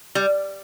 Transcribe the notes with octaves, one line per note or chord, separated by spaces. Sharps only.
G3